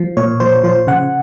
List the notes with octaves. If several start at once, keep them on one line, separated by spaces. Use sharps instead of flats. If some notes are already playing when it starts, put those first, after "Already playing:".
Already playing: F3
A#2 C#5
F3 C5
F3 C5
C#3 F#5